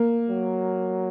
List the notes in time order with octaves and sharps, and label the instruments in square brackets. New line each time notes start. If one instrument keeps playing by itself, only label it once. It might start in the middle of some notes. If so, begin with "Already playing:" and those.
Already playing: [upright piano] A#3
[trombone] F#3